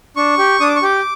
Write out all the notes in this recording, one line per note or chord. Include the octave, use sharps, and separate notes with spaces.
D4 C#6
G4
D4 D#6
D6
C#6
G4 D6